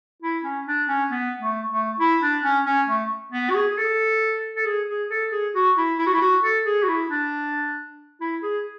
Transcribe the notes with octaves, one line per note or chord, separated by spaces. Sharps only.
E4
C#4
D4
C#4
B3
A3
A3
E4
D4
C#4
C#4
A3
B3
F#4
G#4
G#4
A4
A4
G#4
G#4
A4
G#4
F#4
E4
E4
F#4
E4
F#4
A4
G#4
F#4
E4
D4
E4
G#4